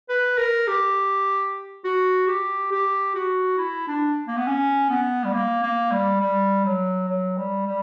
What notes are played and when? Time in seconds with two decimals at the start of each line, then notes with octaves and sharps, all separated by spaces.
0.09 B4
0.38 A#4
0.67 G4
1.84 F#4
2.28 G4
2.71 G4
3.15 F#4
3.58 E4
3.88 D4
4.28 A#3
4.37 B3
4.47 C#4
4.90 B3
5.24 G3
5.34 A#3
5.63 A#3
5.92 G3
6.21 G3
6.65 F#3
7.09 F#3
7.38 G3
7.67 G3